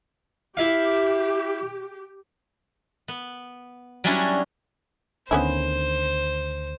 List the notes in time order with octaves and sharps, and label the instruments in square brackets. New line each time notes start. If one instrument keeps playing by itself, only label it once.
[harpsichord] E4 E5 F5 [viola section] G4
[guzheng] B3
F#3 G3 C#4 D4 E4 F#4
[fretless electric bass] D2 D3 D#3 [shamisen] B3 C#4 E4 [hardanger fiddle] C5